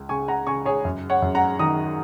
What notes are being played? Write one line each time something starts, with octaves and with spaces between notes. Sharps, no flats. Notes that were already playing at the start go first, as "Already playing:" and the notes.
Already playing: C#2
C#3 G#5 C#6
F#5 A#5
C#3 G#5 C#6
G#4 C#5
F#2
C#5 F#5
F#2
F#5 A#5
D#3 A#5 D#6